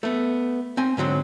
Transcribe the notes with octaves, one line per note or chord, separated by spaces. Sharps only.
A3 B3
C4 G#5
G#2 D3 F#3 C4